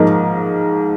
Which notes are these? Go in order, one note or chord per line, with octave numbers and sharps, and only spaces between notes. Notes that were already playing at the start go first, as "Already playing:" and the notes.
Already playing: G#2 F3 A#3 D#4 A#4